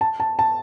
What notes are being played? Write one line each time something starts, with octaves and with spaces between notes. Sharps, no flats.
A5
A5
A5